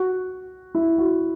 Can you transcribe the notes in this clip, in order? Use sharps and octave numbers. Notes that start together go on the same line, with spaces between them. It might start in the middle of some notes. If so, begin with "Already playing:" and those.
Already playing: F#4
E4
F#4